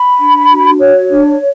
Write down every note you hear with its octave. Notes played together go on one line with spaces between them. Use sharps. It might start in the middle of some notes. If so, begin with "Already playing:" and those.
Already playing: B5
D4
F#4
C#5
D4